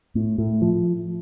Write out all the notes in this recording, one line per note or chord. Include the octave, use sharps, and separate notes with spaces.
A2
A2
F3